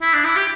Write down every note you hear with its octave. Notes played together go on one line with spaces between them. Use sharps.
E4
D4
E4
G4